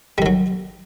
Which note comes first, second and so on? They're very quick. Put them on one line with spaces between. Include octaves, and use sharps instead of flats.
G3 D#3 F#3